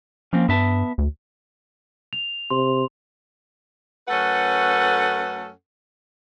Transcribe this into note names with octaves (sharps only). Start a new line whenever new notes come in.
F3 A#3 C4 C#4
G2 B3 E5 A5
D2
F7
C3 C6
F#2 A3 C#4 A4 B4 F#5